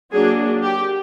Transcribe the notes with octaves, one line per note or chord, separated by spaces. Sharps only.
F#3 A#3 D4 G#4
G4